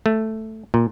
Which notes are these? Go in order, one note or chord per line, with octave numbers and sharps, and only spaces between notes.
A3
A#2